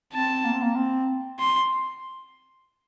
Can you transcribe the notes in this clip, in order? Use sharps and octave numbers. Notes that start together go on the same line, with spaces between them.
C4 A5
A#3
C4
A#3
C4
C6